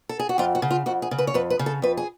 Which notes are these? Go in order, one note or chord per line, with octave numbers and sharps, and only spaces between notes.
A4
G#4
F#4
F2 F4
F#4
C#3
F4
F2 F#4
G#4
C#3
B4
C#5
F2 B4
B4
C#3
A4
F2 B4
G#4